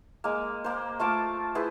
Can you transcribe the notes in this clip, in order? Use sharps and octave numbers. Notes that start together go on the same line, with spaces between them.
G#3 A#3
A#3 C5
A3 F4 A5 D6
E4 G#4 B4 C5